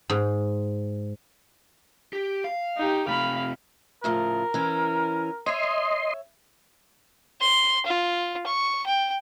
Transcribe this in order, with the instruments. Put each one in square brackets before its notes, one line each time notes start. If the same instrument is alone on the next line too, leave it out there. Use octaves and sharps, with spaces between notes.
[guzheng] G#2
[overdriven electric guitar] G4
F5
[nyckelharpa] D#4 G4
[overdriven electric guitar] C3 A3 [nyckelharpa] F5 B5
[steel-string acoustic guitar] A2 C#3 F3 [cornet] A#4
[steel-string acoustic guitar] E3 C#4
[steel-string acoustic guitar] C#5 E5 [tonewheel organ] D#5 C6
[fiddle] C6
F4
C#6
G5